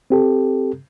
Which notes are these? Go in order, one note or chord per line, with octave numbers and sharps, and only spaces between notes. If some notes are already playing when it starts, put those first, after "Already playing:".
C4 G4 A4